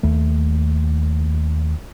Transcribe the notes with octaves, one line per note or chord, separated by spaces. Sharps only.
D#2 A3